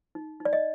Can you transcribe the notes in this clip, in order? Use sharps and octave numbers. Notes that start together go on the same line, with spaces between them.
D#4
D#4
D5
D#5